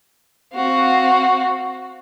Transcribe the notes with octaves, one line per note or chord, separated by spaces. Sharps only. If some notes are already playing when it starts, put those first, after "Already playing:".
C4 F#4 F5